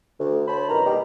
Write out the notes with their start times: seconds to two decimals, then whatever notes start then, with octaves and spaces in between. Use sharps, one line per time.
0.19 D2
0.48 C5 C#5 A5 B5
0.69 C2 F#2 B2 D#3 A#5
0.86 B2 G3 G#3 A#3 D#4 G4